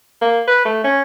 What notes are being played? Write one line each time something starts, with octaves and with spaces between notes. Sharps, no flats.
A#3
B4
A3
C#4